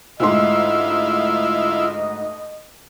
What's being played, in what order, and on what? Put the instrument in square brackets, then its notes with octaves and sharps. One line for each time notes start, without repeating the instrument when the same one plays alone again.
[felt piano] D2 G#2 C6 [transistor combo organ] E4 F4 [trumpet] D#5